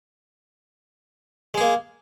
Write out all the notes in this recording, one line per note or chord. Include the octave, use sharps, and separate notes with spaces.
G#3 A#3 G#4